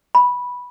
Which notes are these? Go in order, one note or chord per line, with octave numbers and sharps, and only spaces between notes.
B5